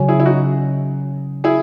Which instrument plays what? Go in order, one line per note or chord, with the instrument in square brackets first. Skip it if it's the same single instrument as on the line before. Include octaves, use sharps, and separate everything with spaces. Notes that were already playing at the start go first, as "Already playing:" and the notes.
Already playing: [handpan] C#3 F#3 C#4
[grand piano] E4 G#4
E4
D#4 F#4
E4 G#4